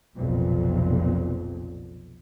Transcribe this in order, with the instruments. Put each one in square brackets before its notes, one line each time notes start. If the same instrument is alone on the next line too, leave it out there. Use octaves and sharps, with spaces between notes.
[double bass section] F1 B1 F2 A#2